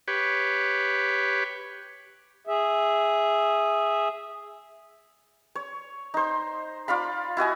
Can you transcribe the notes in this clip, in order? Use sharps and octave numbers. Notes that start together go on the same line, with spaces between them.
G4 B4 C#5
G#4 E5
C#5
D#4 C5
F4 D5 F5 B5
E4 F#4 D#5 G#5